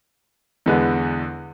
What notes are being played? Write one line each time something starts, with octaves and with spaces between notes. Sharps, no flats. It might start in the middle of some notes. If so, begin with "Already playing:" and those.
E2 D3 G#3 B3